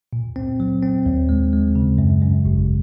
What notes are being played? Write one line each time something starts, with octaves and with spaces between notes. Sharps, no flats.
A#2
C4
F#3
C4
D#2
G#3
G#3
C#3
F#2
F#2
G#1